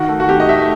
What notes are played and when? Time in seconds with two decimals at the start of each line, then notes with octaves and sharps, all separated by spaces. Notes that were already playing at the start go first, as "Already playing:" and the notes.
Already playing: D#3 F#4
0.09 A3
0.20 F#4
0.29 D#3 G4
0.40 D#5
0.49 A3 E5